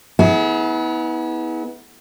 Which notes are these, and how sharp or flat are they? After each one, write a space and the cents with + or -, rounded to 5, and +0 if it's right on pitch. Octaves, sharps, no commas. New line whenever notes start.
B3 +0 E4 -40 G#4 +15